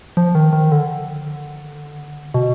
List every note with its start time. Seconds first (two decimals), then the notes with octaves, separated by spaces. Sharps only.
0.17 F3
0.35 D#3
0.53 D#3
0.72 D3
2.34 B2